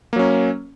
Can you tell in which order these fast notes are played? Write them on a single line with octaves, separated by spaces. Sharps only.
A#3 F#3 C#4